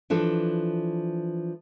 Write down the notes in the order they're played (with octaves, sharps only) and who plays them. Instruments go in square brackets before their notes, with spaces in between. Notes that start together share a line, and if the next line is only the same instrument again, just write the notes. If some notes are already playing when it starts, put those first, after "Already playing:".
[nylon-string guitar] E3 F3 D4 A4